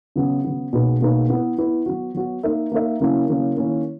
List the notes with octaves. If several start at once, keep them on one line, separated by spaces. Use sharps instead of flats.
C#3 F#3 B3
C#3 F#3 B3
B2 A#3 D#4 G#4 B4
B2 A#3 D#4 G#4 B4
B3 E4 B4
B3 E4 B4
F#3 B3 F#4
F#3 B3 F#4
A#3 D#4 A#4 E5
A#3 D#4 A#4 E5
C#3 F#3 A#3 C#4 E4
C#3 F#3 A#3 C#4 E4
D#3 A#3 C#4 E4